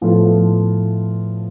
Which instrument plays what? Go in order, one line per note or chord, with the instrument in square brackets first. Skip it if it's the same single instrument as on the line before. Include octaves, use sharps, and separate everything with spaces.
[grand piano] A2 F3 B3 F4 A4